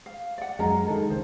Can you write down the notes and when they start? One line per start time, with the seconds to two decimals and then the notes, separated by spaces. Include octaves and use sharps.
0.06 F5
0.38 D5 F#5
0.59 F#2 G#3 A#4 A#5
0.87 D#3 G#3 A4
1.10 C#2 C5